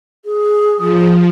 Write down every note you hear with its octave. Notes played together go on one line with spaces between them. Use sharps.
G#4
F3